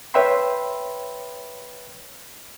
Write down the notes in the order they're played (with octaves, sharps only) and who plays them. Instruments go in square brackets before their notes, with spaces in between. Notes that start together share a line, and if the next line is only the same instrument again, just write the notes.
[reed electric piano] B4 C#5 E5 G5 B5 C6